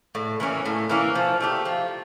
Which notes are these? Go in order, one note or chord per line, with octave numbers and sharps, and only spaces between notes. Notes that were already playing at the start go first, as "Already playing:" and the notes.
A2
E3 A#3 C#4
A2
E3 A#3 C#4
F3
A3 D4 G4
F3